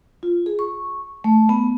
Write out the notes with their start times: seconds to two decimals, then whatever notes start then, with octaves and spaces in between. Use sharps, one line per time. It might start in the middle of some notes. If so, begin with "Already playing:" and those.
0.23 F4
0.46 G#4
0.59 C#6
1.24 A3
1.49 B3